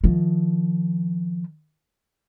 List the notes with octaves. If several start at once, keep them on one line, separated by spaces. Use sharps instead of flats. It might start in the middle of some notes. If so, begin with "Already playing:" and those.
D#3 F3